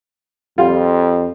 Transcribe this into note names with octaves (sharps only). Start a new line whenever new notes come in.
F2 G3 F4